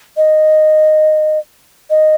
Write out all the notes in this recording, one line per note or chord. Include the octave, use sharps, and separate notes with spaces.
D#5
D#5